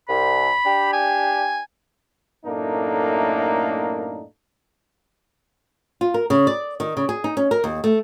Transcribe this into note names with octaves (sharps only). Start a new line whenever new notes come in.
C2 B5
D4 G4
G#5
F#2 A2 A3 A#3 D4 D#4
F4
A#4
C#3
D5
D#3
C#3
G#4
D#4
C#4
A#4
D#2
A3